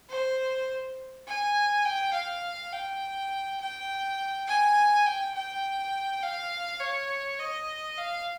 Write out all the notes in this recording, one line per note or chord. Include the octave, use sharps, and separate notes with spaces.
C5
G#5
G5
F5
G5
G5
G#5
G5
G5
F5
C#5
D#5
F5